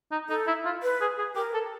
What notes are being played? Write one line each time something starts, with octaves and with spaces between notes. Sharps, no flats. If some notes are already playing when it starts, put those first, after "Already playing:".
D#4
D#4 A4
E4
F4
B4
G#4
G#4
G4 A#4
A4